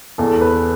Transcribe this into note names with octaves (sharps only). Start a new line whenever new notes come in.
E2 A4
B4